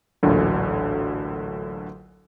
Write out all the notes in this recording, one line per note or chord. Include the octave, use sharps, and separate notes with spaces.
A1 D2 A#2 D3 F#3